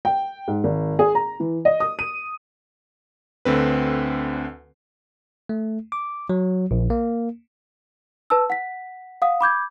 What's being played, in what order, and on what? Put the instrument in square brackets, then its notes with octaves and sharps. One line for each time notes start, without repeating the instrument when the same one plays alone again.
[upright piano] G5
G#2
G#1
G#4
A#5
E3
D#5
D#6
D#7
[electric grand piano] D2 D3 C4 B4
[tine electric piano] A3
D6
F#3
A#1
A#3
[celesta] B4 A5 E6
F#5 B6
F5 F#5 D#6
B5 D6 G6 G#6